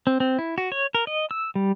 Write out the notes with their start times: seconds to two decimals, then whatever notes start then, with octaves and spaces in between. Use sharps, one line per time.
0.07 C4
0.20 C4
0.39 E4
0.58 F#4
0.72 C#5
0.95 A#4
1.07 D#5
1.31 E6
1.55 G3